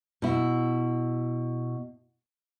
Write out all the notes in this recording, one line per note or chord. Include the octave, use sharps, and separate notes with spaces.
B2 E4